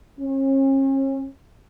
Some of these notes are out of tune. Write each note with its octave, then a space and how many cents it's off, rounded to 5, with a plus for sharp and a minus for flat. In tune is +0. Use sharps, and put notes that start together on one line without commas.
C#4 -40